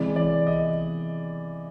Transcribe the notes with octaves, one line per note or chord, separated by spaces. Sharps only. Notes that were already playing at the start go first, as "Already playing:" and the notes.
Already playing: C3 E3 G#3 D5
D5
D#5